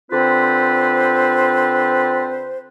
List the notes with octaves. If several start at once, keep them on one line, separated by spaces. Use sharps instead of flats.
D3 C4 F4 B4 C5